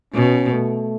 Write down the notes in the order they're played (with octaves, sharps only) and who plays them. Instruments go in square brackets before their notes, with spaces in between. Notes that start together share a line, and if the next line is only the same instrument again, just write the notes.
[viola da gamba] B2 [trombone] C#4
[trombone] A3